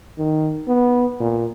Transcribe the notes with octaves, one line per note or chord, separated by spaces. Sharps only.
D#3
B3
A#2